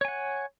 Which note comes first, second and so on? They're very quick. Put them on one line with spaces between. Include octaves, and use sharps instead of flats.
C#5 G#5 F#5